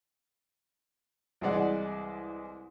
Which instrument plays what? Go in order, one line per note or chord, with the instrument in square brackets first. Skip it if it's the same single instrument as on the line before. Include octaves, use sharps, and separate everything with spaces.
[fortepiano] C2 E3 G#3 D5 F#5